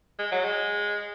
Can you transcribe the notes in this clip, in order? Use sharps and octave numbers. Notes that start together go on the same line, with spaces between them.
G#3
F#3
G#3